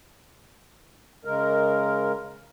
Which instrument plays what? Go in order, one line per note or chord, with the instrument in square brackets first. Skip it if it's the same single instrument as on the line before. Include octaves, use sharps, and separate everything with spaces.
[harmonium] C#3 G#3 A#4